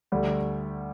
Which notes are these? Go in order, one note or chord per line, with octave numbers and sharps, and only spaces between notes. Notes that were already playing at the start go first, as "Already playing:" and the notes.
D2 D3 G3